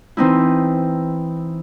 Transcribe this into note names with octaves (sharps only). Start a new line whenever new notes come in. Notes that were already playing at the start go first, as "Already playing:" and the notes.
E3 C4 D#4 E4